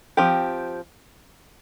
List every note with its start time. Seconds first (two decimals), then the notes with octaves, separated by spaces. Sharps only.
0.17 F3 C4 G4